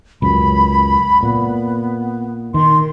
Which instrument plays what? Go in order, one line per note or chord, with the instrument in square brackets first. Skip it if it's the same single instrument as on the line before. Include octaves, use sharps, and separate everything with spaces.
[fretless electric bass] C#2 F#2 [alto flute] B5
[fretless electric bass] A#2 [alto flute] B3
[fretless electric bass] D#3 [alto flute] C6